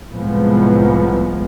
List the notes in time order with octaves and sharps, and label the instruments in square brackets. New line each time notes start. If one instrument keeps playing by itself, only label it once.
[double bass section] C2 A2 F3 G#3 B3